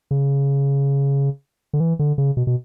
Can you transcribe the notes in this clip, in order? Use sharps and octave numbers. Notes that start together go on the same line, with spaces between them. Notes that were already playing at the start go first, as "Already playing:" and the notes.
C#3
D3
E3
D3
C#3
B2
B2